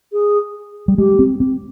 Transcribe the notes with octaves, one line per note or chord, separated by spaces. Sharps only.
G#4
G3
G#3 G4
C4
C4